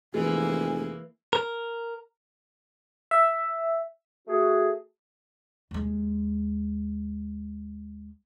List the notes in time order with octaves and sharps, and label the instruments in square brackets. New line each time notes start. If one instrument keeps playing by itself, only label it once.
[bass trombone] F1 [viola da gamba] E3 A#3 [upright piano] G#3 [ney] G#5
[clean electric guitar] A#4
[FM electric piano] E5
[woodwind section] A3 F#4 G#4
[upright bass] D#2 G#3